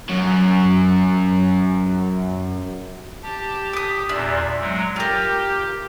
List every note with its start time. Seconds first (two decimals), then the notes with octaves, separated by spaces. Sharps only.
0.09 F#2 F#3
3.23 G4 A5
3.73 D6 D#6 B6
4.09 E2 A#2 D4 E5
4.59 F#3 G#3
4.96 F4 G4 A#4 G5